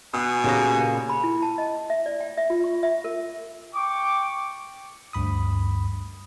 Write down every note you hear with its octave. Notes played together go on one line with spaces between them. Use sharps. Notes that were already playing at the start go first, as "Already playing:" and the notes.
B2 G#5 D#6 F#6 C7
A#2 C#3 A#3 G4 A#4 C#5
B5
E4
A5
D#5
E5
D5
G5
E5
F4
C#6
E5
A#4
G5 C#6 D6
D2 G2 B5 D#6